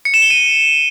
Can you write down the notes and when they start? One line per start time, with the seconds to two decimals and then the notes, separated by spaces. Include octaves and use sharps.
0.05 C#7
0.14 E7
0.22 G7
0.30 D#7